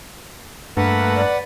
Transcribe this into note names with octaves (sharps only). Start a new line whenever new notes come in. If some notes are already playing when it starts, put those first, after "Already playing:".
G2 A3 A#3 B4 F#5
D5